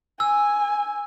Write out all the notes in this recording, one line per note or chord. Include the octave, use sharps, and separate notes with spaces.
G#5 E6